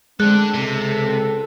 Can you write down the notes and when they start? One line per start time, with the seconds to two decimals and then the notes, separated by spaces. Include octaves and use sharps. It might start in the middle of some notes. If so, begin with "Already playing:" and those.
0.20 G#3 A3 C4 D4 A4 F#6
0.54 C#2 C3 A4